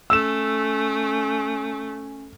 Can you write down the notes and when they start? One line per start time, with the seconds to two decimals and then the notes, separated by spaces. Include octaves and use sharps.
0.10 A3 C#4 E6 E7